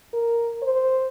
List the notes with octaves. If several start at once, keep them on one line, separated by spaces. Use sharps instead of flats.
A#4
C5